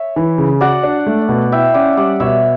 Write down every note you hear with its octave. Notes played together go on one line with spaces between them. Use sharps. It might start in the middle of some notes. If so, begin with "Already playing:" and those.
Already playing: C#5 E5
E3
C#3
F#4 D5 F#5
D4
A3
B2
E4 E5 G5
C#4 D5 F#5
G3 D5 F#5
B2 C#5 E5